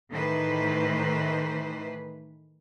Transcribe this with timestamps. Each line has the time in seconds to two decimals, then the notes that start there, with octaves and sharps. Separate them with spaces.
0.11 A2 D#3 E3 B4 C5